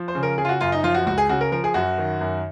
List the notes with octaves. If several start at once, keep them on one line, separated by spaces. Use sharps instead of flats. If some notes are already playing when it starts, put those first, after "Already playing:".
Already playing: F3
C5
C#3
A#4
C#3 G#4
F4
F#4
F#2 F4
D#4
F3 F4
F#4
C#2 F#4
G#4
C#3 F#4
A#4
F3 A#4
G#4
F#2 F#4
D#3
F#2